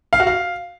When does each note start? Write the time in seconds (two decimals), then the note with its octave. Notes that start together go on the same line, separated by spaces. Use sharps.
0.13 F5
0.20 F#4
0.27 F5